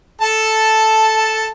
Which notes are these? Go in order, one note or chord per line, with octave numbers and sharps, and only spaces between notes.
A4 A5